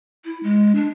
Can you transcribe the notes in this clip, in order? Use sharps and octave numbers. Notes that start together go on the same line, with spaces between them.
E4
G#3
D4